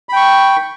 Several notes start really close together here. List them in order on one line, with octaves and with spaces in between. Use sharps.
B5 G5 C#6